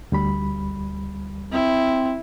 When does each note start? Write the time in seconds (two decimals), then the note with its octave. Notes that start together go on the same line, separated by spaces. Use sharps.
0.12 D2 G3 B5
1.52 C4 E4